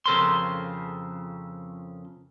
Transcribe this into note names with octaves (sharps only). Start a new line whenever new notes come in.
F2 C#3 A4 A#4 C5 C6